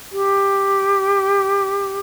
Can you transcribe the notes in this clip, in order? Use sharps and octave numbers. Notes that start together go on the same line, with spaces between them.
G4